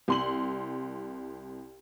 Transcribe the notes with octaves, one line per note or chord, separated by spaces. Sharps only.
C2 C6 F#7